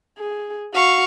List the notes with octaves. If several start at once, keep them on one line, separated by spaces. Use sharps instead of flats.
G#4
F#4 F5 C#6